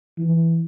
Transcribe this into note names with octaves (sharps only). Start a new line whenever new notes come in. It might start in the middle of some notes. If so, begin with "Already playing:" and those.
E3